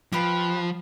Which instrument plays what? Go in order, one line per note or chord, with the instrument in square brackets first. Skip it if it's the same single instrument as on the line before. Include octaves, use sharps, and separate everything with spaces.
[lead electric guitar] F3 [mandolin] G4 B4 F5